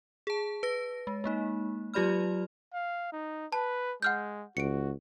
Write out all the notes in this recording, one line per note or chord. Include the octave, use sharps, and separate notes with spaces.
G#4 A5
B4 A#6
G#3
G#3 A#3 D#4
F#3 F4 G4 D5 B5 F6
F5
D#4
B4 A5
G#3 F#5 F6 G6
C#2 F#4 C#7 D7